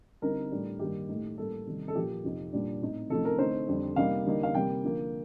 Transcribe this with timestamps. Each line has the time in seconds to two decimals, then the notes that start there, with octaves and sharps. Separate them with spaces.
0.22 D3 G3 C4 D#4 A#4
0.51 A2 G3 D4
0.79 G2 D#3 G3 A#3 G4
1.09 A2 A3 D#4
1.38 A2 G3 A#3 A4
1.66 C3 D#3 G3
1.88 A4
1.95 A#2 F3 A#3 G4
2.24 F2 C3 F3 C4 D#4
2.53 A#2 G3 D4
2.81 A2 A3 C4 D#4
3.10 C3 F3 A3 D#4 A4
3.25 A#4
3.39 D3 A3 C4 D#4 C5
3.68 F2 D3 G3
3.96 C3 G3 A#3 D#4 F5
4.25 D3 G3 A#3 D#4
4.43 F5
4.55 C3 G3 A#3 G5
4.83 D3 F3 A#3